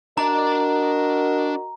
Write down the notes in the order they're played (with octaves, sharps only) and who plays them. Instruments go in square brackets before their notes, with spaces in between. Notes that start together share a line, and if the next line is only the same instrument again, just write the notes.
[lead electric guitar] D4 A5 [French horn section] F#4 A#4 D#5 [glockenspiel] A#5